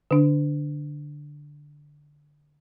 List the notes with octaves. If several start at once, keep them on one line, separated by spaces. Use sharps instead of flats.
D3 D4